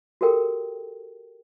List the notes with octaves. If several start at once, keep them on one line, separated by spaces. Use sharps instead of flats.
F#4 G4 A4 A#4 G5